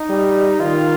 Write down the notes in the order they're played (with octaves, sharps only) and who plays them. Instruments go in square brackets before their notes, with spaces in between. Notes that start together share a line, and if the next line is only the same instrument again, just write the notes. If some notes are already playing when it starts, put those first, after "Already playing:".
Already playing: [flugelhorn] D#4
[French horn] G3
[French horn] D#3 [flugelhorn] F4